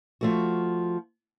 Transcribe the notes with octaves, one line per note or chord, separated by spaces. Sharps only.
F3 A3 F#4